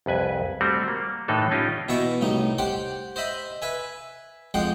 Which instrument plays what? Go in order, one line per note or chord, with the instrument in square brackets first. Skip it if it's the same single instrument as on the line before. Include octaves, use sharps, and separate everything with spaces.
[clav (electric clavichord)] C2 F2 B4 G#5
G3 A3 C4 F#4
A#3
A2 E3 D4 D#4 A4
C#4 D#4 F4 G4 D#5
[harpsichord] B2 E3 E5 C#6
C2 A2 D#4
G4 C5 F#5 G5
C5 D#5 E5 B5
B4 E5 G#5
F2 G#3 F#5 G5 C6